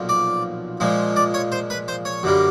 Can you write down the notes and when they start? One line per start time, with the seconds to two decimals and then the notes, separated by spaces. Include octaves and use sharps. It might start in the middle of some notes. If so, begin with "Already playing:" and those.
Already playing: B1 A#2 F3
0.09 D5
0.80 A#2 F3 G#3
1.16 D5
1.34 C#5
1.52 C5
1.70 B4
1.88 C5
2.05 C#5
2.23 F#2 D3 G3 A#3